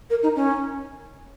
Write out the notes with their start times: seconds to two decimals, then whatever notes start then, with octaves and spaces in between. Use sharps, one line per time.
0.10 A#4
0.23 D#4
0.36 C#4